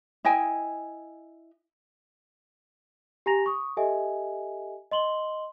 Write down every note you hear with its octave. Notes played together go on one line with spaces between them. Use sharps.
E4 D#5 G5 G#5
G4 G#5 A#5 A#6 F7
C#6 D#6
G4 A4 D#5 E5 G#5
D#5 C6 F#7 G7